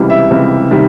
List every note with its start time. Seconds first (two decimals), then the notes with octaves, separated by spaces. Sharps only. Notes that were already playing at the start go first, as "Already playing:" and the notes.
Already playing: C#2 C3 E3 G3
0.10 E5
0.31 C#2 C3 E3 G3
0.71 C3 D#3 G3